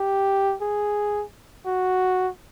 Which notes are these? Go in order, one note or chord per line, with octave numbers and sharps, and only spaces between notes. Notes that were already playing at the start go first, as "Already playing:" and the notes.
Already playing: G4
G#4
F#4